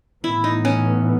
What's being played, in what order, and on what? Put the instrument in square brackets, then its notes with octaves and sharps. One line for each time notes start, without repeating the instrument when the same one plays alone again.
[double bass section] A2 E3 B3 [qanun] E4
[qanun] D#4
C#4